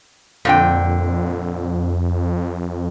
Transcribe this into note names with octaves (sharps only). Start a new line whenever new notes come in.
F2 A#2 D3 G5